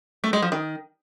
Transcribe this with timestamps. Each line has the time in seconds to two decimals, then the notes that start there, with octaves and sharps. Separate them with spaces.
0.24 A3
0.33 G#3
0.42 F3
0.52 D#3